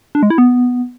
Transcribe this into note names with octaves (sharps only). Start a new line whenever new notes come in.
D4
G#3
E4
B3